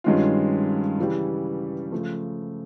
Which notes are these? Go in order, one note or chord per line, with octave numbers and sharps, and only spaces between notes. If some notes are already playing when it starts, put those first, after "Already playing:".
G2 D#3 G#3 C#4 F4
C#3 E3 G3
C#3 F3 A3